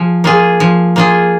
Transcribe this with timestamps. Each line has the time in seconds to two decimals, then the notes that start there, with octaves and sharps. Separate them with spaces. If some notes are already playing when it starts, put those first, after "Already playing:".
Already playing: F3 G#4
0.24 A#3 F4 G#4
0.60 F3
0.96 A#3 F4 G#4